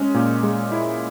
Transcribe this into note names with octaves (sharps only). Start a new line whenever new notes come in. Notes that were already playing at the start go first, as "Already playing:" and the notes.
Already playing: G#3 C#4
A#2
G#3
E4